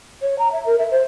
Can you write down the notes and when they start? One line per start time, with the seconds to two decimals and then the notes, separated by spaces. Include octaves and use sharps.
0.22 C#5
0.39 A#5
0.52 E5
0.66 A#4
0.78 E5
0.91 C5